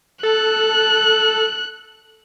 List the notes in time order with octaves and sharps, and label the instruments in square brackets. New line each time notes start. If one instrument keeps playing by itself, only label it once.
[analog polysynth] A4 [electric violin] F#6